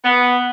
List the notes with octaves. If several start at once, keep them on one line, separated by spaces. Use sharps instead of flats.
B3